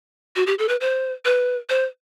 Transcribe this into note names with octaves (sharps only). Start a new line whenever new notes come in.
F#4
G4
A4
B4
C5
B4
C5